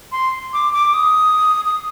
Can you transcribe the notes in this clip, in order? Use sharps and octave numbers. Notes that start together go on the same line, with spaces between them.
C6
D6
D6
D#6
D#6